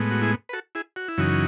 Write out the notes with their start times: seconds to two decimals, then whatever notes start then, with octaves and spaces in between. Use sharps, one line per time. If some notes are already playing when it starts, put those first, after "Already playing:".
Already playing: A2 G#3 B3
0.11 F#4
0.22 E4 G#4
0.49 B4
0.53 F#4 A4
0.75 E4 G#4
0.96 F#4
1.08 E4
1.18 F#2 C#3 E3 D#4 F#4